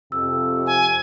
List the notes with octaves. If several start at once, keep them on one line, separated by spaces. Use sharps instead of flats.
F2 C3 E6
G#5